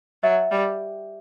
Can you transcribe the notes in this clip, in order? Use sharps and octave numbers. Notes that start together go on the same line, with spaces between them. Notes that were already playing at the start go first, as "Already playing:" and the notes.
F#3 E5
G3